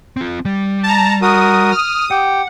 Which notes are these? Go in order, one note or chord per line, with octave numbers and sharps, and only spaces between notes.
C4 F4
G3
A5 A#5
F#4 A#4 D#6
F6
G4 F#5 G5